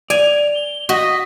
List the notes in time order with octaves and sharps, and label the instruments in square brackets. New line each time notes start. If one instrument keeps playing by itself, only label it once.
[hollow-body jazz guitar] D5 [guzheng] G#5 [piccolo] F7
[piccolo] G7
[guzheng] F#4 [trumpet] D#5 [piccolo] B6